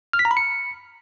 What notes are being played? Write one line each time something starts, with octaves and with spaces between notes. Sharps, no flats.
F6
B6
A#5
B5
C#7